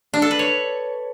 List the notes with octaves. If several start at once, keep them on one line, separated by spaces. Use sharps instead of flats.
D4
A4
B4
C#5